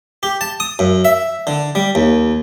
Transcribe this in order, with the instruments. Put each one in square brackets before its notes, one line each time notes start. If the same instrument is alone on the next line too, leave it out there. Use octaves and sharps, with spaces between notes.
[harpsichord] G4
A5
D#6
F#2
E5
D3
G3
D#2